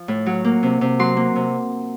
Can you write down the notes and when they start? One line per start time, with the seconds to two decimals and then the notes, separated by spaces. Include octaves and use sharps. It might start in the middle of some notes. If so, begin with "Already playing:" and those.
Already playing: F3
0.08 A2
0.26 F#3
0.44 A#3
0.63 C3
0.81 C3
0.99 F#3 C6
1.17 A#3
1.36 C3